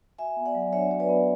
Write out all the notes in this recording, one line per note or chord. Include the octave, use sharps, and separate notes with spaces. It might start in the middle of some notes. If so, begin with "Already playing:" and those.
F#4 E5 G#5
B3
D5 F#5
F#3
D4 C#5 E5
F#4 C#5
B4 D5
B3